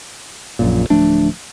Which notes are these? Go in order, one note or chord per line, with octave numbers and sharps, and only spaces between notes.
A#1 F#2 A#2
D1 F3 A3 D4